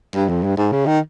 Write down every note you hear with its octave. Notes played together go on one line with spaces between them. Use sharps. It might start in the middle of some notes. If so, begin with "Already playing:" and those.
G2
F2
G2
G#2
C#3
D#3